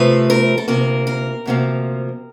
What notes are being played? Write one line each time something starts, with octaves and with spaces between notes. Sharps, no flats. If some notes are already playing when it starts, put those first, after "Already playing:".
Already playing: C3 F3 A3 C4 B4
A#4
A4
D2 C3 F3 A#3 A#4
A#4
D2 C3 F3 A#3